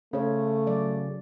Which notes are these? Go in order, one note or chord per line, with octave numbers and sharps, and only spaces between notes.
C#3 A3 C5 C#5
F#3 D5